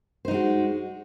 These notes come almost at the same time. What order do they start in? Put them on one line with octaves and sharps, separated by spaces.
C5 D#4 G#3 F#4